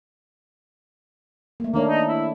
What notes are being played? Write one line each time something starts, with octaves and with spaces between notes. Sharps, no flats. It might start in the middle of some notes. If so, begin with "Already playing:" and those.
A3 A#3
D#3 A#3 D4 C#5
D#4
E4